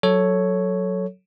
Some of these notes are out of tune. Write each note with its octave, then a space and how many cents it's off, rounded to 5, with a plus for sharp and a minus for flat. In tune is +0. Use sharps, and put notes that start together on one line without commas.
F#3 +0 A4 +0 C#5 +0